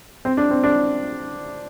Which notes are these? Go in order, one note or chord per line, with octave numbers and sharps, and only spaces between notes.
C4
D4
C4
D4